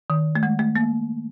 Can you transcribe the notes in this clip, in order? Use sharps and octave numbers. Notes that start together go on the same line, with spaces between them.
D#3
A3
G#3
A3
A#3